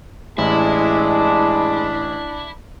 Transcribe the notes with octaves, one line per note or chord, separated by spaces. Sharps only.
A1 G#3 D4 E4